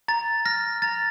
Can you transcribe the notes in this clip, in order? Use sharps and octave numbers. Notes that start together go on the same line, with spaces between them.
A#5 A6
F6 A#6
A#5 A6